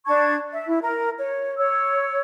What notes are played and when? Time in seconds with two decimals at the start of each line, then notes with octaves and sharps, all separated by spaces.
0.06 D4 A5 C#6 G#6
0.53 E5
0.66 E4
0.80 A#4
1.17 C#5
1.57 C#5 E6